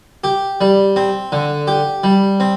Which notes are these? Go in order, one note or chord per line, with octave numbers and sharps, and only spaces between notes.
G4
G3
C4
D3
G4
G3
C4